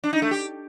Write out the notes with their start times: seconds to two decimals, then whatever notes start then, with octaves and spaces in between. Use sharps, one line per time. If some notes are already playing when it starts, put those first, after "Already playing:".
0.04 D4
0.13 D#4
0.22 A3
0.31 G4